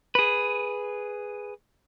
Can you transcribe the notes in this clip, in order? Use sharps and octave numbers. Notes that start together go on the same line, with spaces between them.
G#4 B4